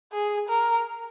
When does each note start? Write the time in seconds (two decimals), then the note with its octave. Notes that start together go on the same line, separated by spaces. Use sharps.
0.13 G#4
0.49 A#4